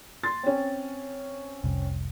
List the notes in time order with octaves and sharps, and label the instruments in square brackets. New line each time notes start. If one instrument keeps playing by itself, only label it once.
[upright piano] C6 A6
C4 C#4
[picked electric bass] F1 C2